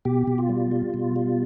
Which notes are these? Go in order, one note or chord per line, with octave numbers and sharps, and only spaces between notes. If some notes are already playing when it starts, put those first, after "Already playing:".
B2 G4
B2
F4
G3
G3
B2
G3